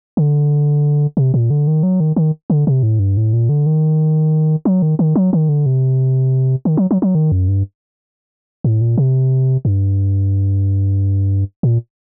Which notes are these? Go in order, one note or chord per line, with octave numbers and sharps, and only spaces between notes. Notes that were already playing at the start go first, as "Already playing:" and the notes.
D3
C3
A#2
D3
D#3
F#3
D#3
D#3
D3
C3
A2
G2
A2
A#2
D3
D#3
F#3
D#3
D#3
F#3
D#3
D3
C3
D#3
F#3
F#3
F#3
D#3
F#2
G2
A2
A#2
C3
G2
A#2